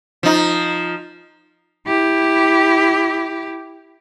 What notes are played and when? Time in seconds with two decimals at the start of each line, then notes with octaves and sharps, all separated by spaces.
0.23 F3 D#4
1.87 E4 G4